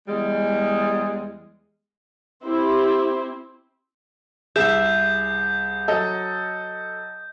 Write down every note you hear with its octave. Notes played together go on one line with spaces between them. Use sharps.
E2 G3 G#3
C4 E4 G4 C5
C2 G#4 E5 G6 E7
F#3 A4 D#5